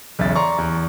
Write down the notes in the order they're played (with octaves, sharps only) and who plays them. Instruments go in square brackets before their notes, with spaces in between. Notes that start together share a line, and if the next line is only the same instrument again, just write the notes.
[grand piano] B1 E2 C#3 E5 A6
D5 A#5 C6 C#6
E2